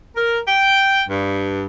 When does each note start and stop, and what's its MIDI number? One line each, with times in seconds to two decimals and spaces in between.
0.16 0.39 70
0.47 1.02 79
1.08 1.66 43